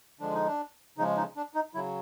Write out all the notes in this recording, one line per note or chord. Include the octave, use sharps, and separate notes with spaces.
D3 F3 G#3 D4
D#4
D4
C#3 F3 G#3 D#4
D#4
D4
D#4
C#3 F#3 E4